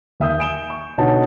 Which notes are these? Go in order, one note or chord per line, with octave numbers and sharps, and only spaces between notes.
D#2 E5 D#6 G6
G#5 D7 E7 G7
C#6
B2 D3 D#4 F#4 C#5 A5